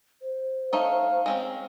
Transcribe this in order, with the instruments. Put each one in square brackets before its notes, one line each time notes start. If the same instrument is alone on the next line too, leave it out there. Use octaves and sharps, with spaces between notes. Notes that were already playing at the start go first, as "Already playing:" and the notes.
[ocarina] C5
[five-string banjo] A3 D#4 C#5 [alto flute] F5
[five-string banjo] G#3 C4 C#4